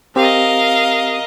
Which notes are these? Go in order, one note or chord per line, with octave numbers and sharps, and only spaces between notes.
C4 G4 A#4 D#5 F5